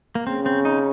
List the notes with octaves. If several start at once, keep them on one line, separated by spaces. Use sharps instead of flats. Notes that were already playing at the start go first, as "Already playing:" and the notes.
A#3
C#3 C4
C4
D#4